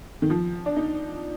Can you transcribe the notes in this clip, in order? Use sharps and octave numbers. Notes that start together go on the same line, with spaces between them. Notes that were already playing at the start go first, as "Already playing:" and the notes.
D#3
F3
D4
D#4